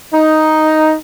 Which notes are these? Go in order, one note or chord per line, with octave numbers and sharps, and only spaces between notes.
D#4